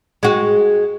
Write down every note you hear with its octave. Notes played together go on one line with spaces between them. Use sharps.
G#3 F#4